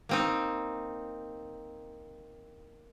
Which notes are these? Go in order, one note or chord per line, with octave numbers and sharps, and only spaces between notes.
A#3 C4 D#4